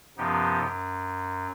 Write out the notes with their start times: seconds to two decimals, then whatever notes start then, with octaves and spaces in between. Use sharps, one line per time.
0.18 F#2 C3 F3 B3 D#4 G4
0.61 F#2